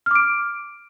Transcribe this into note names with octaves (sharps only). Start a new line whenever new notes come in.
D6 F6 D7